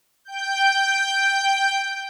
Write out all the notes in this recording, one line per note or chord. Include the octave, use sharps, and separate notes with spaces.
G5 G6